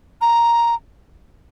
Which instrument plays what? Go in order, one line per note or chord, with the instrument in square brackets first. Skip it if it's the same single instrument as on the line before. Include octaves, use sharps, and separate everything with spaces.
[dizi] A#5